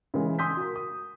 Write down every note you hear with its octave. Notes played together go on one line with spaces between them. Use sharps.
C#3 E3 G#3
G#5 C6 D#6 E6 G6 B6
F#4 A#4
D#6